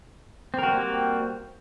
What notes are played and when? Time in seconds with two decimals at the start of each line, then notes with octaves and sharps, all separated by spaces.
0.54 C4
0.58 A#4
0.63 F#4
0.68 G3
0.73 A#3